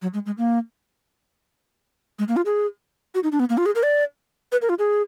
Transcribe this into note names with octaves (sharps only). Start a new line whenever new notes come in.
F#3
G#3
G#3
A#3
G#3
A#3
F4
G#4
F#4
D#4
D4
B3
A#3
F4
G#4
A#4
D5
B4
A#4
F4
G#4